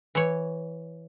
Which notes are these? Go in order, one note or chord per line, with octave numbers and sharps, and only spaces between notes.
E3 C#5